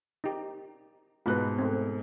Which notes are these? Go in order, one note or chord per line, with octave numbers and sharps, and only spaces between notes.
D#4 G4
G#2 B2 F4 B4 F#6
A3 C4